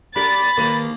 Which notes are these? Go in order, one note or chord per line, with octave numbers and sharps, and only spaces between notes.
D4 G4 A#4 B5 A6
D#3 A#3 B4